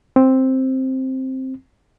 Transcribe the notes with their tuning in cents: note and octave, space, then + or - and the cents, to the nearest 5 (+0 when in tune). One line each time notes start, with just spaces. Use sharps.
C4 +5